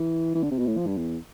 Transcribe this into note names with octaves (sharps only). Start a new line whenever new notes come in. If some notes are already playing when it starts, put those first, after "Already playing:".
Already playing: E3
E3
D3
C3
B2
A2
F3
G2
E2